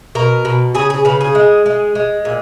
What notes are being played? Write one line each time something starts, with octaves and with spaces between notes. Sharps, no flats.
B2 A#4
B2
C#3 G#4
G#4
C#3 B4
G#4
G#3
G#3
G#3
A#2